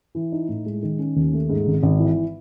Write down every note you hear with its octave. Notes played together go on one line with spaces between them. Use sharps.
E3
D#4
A2
G#3
D#3
C#4
D#2
A3
G#2
G#1
G#1
E3